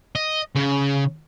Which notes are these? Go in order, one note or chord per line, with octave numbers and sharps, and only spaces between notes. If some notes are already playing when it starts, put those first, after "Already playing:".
D#5
C#3